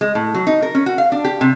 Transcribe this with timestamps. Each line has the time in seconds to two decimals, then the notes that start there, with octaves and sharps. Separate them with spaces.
0.01 G#3
0.15 A2
0.34 F#3
0.47 D#4
0.62 A#4
0.75 C#4
0.86 F#4
0.98 F5
1.12 D4
1.25 G4
1.41 C3